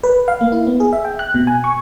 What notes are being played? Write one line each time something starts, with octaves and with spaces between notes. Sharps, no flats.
B4
F5
A#3
E4
B3
G#4
E5
G5
F#6
B2
G#5
C#6